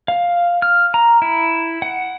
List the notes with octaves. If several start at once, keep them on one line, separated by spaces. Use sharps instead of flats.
F5
F6
A#5
E4
F#5